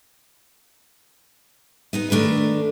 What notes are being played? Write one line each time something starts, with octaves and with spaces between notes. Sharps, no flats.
B3 D#4 D#5
D#3 A3 D4 A#4 B4